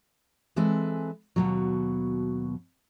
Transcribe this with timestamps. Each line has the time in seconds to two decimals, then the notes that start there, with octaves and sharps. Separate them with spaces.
0.56 E3 G#3 C4 A4 B4 G#5
1.36 D#2 B2 F#3